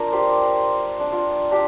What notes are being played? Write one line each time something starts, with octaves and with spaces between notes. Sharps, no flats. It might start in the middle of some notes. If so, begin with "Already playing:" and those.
Already playing: D4 F4 A#4
G4 C5
D4
F4
D4 G4